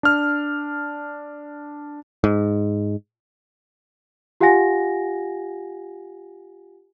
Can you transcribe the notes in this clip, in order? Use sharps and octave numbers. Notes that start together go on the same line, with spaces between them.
D4 F6
G#2
F4 G4 F5 F#5 G#5 A#6